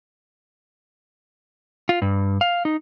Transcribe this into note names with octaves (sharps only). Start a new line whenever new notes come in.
F4
G2
F5
D#4